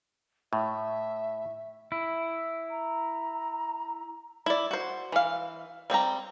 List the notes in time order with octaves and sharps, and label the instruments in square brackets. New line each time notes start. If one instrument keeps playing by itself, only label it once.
[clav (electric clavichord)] A2 [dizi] E5
[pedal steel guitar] E4
[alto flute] A#5
[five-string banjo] E4 D5
F#4 C5
E3 F5
G3 C4 G5 A#5